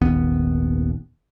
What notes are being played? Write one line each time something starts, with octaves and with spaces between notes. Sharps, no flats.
D#1 G#1 D#2 B3